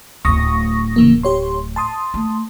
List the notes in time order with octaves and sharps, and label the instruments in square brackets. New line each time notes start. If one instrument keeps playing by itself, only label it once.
[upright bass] D1 A2 [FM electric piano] C#6 D#6 A#6
[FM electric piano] C#3 E3 A#3
G4 C#5 C6
A5 C6 D#6
[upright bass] A3